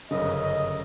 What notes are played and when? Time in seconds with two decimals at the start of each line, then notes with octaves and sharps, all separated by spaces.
0.11 G1 F#2 C#3 D#5
0.43 D#5